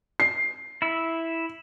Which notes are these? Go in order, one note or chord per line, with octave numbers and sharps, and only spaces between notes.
C7
E4 E6